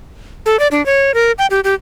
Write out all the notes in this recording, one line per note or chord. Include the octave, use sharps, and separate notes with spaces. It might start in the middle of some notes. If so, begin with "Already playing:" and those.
A4
D5
D4
C#5
A#4
G5
G4
G4